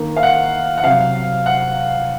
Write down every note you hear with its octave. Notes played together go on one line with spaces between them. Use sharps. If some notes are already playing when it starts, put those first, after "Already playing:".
Already playing: D#3 A#3
F5
F#5
F#5
C3 F#3 C4 F5
F#5